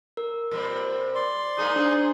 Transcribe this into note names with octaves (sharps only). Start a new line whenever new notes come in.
A#4
A#2 G3 C4
D5 C6
G#2 A#3 D#4 G#4
D4 G#4 C5 A#5